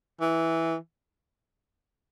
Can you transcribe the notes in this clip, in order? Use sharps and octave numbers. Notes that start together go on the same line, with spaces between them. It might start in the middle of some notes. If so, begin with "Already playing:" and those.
E3